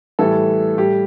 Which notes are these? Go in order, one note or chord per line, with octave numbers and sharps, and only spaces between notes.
A2 E3 G3 A4
A2 G3 G4